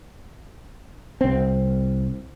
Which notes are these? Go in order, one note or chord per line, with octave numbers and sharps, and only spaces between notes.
C2 C4